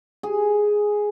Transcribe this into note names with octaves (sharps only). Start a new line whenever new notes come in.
G#4